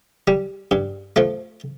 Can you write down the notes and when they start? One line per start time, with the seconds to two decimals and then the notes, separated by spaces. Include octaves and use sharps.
0.28 G3
0.71 G2
1.16 F3 A3